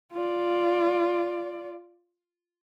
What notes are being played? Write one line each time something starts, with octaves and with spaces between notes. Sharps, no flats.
F4 D5